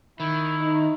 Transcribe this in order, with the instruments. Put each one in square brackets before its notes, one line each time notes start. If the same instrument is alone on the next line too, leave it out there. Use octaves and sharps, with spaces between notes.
[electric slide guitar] D#3 [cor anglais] E4
[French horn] D#4